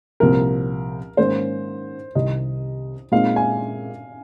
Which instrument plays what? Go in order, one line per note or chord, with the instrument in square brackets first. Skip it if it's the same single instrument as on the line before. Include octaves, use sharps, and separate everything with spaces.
[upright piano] C2 A#2 F3 C4 [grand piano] A#4
[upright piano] G#2 D#3 A#3 C#4 [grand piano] C5
[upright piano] C2 C3 D#3 [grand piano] D#5
[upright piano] A#2 G#3 C4 D#4 [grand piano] F5
[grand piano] G#5